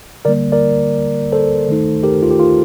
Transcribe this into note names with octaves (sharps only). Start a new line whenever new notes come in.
D3 G3 A#3 A#4 D5
A#4 D5
A4 C5
D#3 A3 D#4
G4 A#4
F4
G4
F4